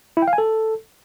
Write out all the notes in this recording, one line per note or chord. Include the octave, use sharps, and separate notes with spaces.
E4
G5
F5
G#5
A4